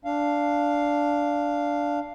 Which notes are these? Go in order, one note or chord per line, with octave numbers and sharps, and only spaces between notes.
D4 F5